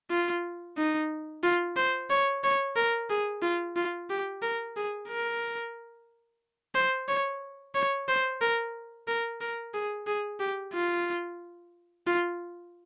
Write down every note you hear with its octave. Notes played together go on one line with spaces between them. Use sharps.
F4
D#4
F4
C5
C#5
C#5
A#4
G#4
F4
F4
G4
A#4
G#4
A#4
C5
C#5
C#5
C5
A#4
A#4
A#4
G#4
G#4
G4
F4
F4